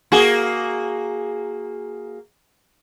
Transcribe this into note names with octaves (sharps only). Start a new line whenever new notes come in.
A#3 F#4 G#4